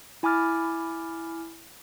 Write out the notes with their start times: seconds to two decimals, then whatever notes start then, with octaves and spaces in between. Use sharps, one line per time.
0.23 E4 G#5 B5 D6 F6 A6